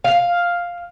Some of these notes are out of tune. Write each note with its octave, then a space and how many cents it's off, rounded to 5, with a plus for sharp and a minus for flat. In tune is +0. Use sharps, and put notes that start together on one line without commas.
F5 +5